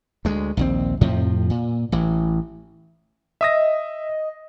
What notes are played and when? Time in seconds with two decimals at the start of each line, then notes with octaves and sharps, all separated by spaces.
0.25 D2 G#3
0.57 A#1 D#2 C4
1.01 F2 A2 C3 F3
1.50 A#2
1.92 A1 E3
3.41 D#5 E5 D#6 A#6